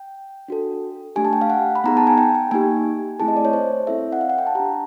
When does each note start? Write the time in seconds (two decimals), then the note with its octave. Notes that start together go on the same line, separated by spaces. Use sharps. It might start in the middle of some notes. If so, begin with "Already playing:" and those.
Already playing: G5
0.48 D4 F#4 A4
1.16 A3 D4 G4 G#5
1.25 A5
1.33 G5
1.41 F5
1.50 F#5
1.75 B5
1.84 B3 D#4 G#4 A#5
1.97 A5
2.07 G#5
2.18 G5
2.35 G5
2.51 A#3 D#4 G4 G#5
3.20 A3 C4 E4 G#4 A5
3.28 D#5
3.37 D5
3.45 C#5
3.53 C5
3.87 C4 E4 A4 E5
4.13 F#5
4.21 F5
4.30 F#5
4.38 G5
4.46 A5
4.55 D4 G4 A#5